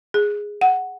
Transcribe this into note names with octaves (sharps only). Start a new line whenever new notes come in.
G#4
F#5